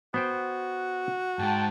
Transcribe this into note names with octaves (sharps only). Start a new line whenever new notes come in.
B3 F#4 C5 G5
G#2 G#3 G5 A5